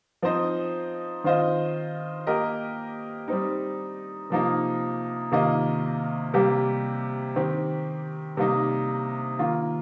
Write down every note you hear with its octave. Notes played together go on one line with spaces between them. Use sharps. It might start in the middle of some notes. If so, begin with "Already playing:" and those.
F3 C4 D#4 C5 D#5
D#3 C4 F4 C5 D#5
A#3 G4 A#4 D#5
G3 C4 D#4
C3 F3 A#3 D#4
C3 D#3 A#3 F4 D#5
C3 G3 A#3 G4
D#3 C4 G4
C3 G3 A#3 D#4
D#3 A#3 F4